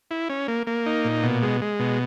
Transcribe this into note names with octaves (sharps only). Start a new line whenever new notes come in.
E4
C#4
A#3
A#3
D#4
A#2
B2
G#3
G#3
B2